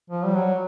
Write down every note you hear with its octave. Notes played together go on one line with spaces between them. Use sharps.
F3
G3
F#3